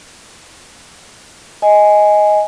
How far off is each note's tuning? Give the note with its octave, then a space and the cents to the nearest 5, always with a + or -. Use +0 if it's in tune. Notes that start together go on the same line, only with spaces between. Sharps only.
D#5 +10 G#5 +0